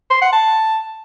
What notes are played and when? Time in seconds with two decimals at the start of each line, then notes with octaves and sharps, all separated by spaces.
0.10 C6
0.21 F#5
0.33 A5